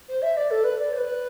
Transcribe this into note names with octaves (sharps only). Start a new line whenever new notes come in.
C5
E5
D5
A4
B4
D5
C5
B4